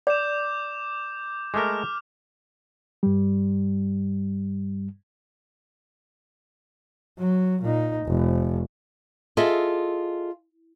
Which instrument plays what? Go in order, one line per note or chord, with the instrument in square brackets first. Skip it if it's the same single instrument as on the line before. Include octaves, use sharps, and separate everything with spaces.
[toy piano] D5 [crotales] D6 G6 E7
[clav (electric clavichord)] G#3 A3 A#4 [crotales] D6 F6
[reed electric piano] G2 G3
[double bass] F#3
A#2 D#4
F1
[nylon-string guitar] F4 G#4 A4 D#5 E5